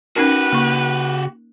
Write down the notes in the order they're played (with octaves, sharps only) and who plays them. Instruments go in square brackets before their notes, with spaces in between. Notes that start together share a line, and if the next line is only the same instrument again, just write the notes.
[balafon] C#4 D#4 A#4 [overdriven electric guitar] F#4 G4 [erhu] B4
[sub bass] C#3 [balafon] A#3 C#6